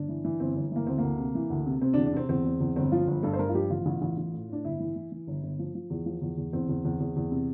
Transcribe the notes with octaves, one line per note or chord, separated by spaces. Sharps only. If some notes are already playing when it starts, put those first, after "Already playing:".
Already playing: G1 D4
E3
E3
G1 C4
G1
E3 A#3
D2 C4
D2 A#3
C3
E3
D2
C3
C3 C4
D4
E2
D4
C3 C4
E2 C4
E2
E2
G1 C4
F3 F4
G1
G2 A4
C5
G2 A#4
F4
F3 G4
A1 F4
A1
A1
A1
A2
A2 D4
G1 E4
E3
E3
E3
G1
G1
F3
F3
E2
F3
E2
E2
E2 C4
E2
E2
E2
E2
C3